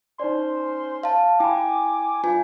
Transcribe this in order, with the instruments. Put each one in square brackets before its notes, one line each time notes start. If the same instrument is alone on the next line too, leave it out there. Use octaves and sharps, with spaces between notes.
[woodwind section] C#4 C5 C6 [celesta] D#4 D5
[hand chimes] F5 A5
[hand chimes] E4 [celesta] G5 B5 [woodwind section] G#5 D6
[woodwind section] G2 [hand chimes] F4 G#5